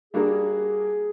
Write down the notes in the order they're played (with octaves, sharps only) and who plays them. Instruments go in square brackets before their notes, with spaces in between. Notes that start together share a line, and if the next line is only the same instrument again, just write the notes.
[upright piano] G3 A#3 D4 F#4 A#4 [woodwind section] G#4